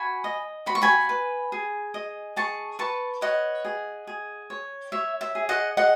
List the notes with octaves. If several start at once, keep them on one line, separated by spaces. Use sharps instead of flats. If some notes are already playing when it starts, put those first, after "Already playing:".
Already playing: F#4 G#5 B5
D#5
F#4 B5
C#6
G#5 B5
B4
G#4
D#5
G#4 A5 C#6
B4 A5 C#6
C#5 D#5 F#5
G#4
G#4
C#5
C#5 E5
E5
G#4
D#5 F#5
G#4 D#5 F#5